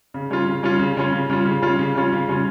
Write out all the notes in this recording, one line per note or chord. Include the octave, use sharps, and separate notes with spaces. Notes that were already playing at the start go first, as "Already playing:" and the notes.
C#3
G3 C#4 F4
C#3
G3 C#4 F4
C#3
G3 C#4 F4
C#3
G3 C#4 F4
C#3
G3 C#4 F4
C#3
G3 C#4 F4
C#3
G3 C#4 F4